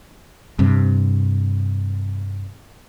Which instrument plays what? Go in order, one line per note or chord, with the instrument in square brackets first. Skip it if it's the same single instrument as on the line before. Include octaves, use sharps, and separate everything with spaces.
[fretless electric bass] G2 C3